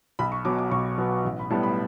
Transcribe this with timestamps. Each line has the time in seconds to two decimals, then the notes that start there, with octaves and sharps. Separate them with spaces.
0.19 B1 B5
0.32 C#6
0.45 B2 F#3 B3 D6
0.59 D6
0.71 B1 C#6
0.98 B2 F#3 B3
1.25 A1
1.39 B5
1.50 A2 G3 B3 A5
1.63 B5